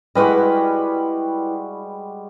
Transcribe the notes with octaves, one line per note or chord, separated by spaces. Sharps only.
G3 G#3 E4 F#4 B4 D#5